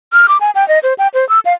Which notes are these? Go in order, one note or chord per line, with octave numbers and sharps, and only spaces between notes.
F6
D6
G#5
G5
D#5
C5
G5
C5
E6
F5